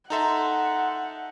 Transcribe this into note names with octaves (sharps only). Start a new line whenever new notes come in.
D#4 A4 E5 F#5 A#5 C6